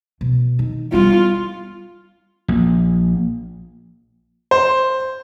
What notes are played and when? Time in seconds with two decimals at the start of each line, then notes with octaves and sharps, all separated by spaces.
0.21 B2
0.59 D#3
0.92 G3 B3 F4
2.48 A#1
4.51 C5